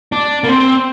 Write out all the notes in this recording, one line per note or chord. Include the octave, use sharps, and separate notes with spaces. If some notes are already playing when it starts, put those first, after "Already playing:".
D4
A#3
C4